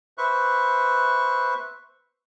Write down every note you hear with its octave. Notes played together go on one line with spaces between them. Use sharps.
B4 C5 E5 C#6 F#6